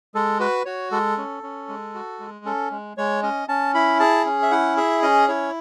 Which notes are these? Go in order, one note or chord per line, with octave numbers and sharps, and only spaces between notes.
G#3 A4
F#4 B4
F#4 C#5
G#3 A4
C#4
C#4
G#3
F#4
G#3
C#4 A4
G#3
G#3 C#5
C#4 D#5
C#4 A5
E4 B5
G#4 A5
C#4
E5
E4 F#5
G#4 E5
C#4 D#5
E4 C#5